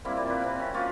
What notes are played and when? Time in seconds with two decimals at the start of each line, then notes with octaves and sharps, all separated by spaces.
0.05 G3 A#3 C4 E4
0.17 A#2
0.30 B4
0.44 C3
0.59 C#4 B5
0.74 A#3 F4 F#4